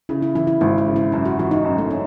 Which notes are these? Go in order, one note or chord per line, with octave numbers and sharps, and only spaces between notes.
C#3 E4
E4
E3 E4
E4
G#1 E4
E4
C#3
E4
F#2 E4
F#4
E3 F#4
D#4
F#2
A3
C#4